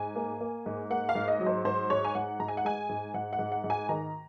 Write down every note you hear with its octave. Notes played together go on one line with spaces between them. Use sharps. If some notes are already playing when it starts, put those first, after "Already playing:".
Already playing: G#2 G#5
A#3
A#3
G#2
A#3 F#5
F5
G#2
D#5
F#3
C5
G#2 C5
G#2 C#5
G#5
G#2 F#5
G#2 A#5
G#5
F#5
G#3 G#5
G#2
G#2 F#5
F#5
G#2
F#5
G#2
G#5
D#3 A#5